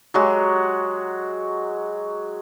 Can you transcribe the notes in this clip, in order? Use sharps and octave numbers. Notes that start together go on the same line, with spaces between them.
F#3 G#3 F#4 G4